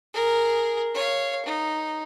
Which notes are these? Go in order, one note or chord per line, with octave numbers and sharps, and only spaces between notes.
G#4 A#4
C#5 F5
D#4